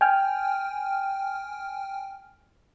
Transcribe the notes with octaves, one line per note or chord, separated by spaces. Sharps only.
G5 G#5 F6